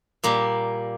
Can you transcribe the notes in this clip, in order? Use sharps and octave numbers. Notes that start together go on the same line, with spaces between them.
A#2 G3 A#3